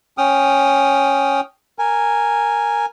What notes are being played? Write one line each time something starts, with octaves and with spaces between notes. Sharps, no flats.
C#4 G5 D#6 F6
A#4 G#5